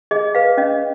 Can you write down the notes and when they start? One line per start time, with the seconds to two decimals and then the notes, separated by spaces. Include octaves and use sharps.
0.11 G#4 D#5
0.35 B4 F5
0.58 C#4 D#5